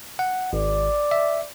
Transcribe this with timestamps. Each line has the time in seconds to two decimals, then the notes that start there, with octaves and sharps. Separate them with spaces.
0.19 F#5
0.53 G#1 D5
1.11 E5